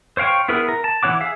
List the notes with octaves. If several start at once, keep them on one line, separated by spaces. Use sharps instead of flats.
C5 C#5 F5 G5 C#6
B3 E4 G#4 A#4 B4
A#4
A5
E3 F4 C#5 F#5 D6
G#4 E5 F5